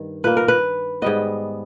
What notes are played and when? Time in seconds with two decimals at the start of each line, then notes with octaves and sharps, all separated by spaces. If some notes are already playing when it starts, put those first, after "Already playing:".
Already playing: G2 D#3
0.24 A#2 A#3 B4
0.37 A#4
0.48 B4
1.02 G#2 G3 B3 D#5